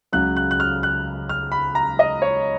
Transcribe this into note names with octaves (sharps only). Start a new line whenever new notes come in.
C#2 C#3 F#3 F#6
F#6
F#6
F6
F#6
F6
B5
A#5
D#5
C#5